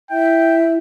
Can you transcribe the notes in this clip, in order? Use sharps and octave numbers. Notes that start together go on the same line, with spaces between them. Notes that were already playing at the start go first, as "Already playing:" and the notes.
E4 E5 G5